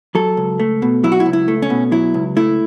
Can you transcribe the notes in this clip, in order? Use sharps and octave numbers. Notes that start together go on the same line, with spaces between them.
F#3 A4
C#2
A3
B2
F#3 E4
F#4
E4
C#2
E4
A3
C#4
B2
F#3 E4
C#2
A3 E4